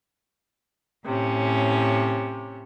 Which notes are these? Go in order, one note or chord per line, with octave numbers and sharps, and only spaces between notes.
A2 C3 C#4